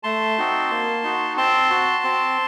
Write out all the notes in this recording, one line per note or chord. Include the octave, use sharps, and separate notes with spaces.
A3 A5 C6
C4 D#4 F#4
A#3
D#4 F#4
C4 A5 C6
F#4
C4